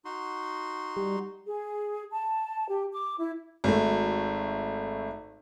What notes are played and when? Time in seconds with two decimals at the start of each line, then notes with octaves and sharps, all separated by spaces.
0.05 D#4 F#4 C6
0.96 G3
1.46 G#4
2.12 A5
2.68 G4
2.93 D6
3.19 E4
3.64 G#1 A3